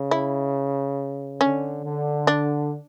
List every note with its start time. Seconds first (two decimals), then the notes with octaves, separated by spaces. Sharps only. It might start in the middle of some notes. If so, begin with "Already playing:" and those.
Already playing: C#3
0.11 E4
1.41 D3 C#4
1.84 D3
2.27 D4